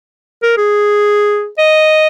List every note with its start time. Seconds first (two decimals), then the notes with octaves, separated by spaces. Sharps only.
0.43 A#4
0.57 G#4
1.58 D#5